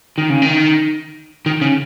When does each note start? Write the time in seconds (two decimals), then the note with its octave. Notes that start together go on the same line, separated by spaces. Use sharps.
0.18 D#3
0.30 C#3
0.42 D#3
1.46 D#3
1.61 C#3